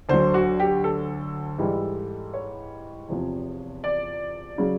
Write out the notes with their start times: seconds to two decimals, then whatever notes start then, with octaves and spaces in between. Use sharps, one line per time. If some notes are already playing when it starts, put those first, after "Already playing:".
0.09 D2 D3 F#3 C5
0.34 F#4
0.60 G4
0.84 A4
1.58 G#2 E3 G3
2.34 C#5
3.09 E2 C3 F3
3.84 D5
4.58 C#3 F#3